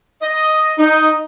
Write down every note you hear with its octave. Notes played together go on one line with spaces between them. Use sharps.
D#5
D#4